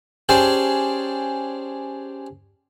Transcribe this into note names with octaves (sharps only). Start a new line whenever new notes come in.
C#4 G4 G#4 C5 D5 A5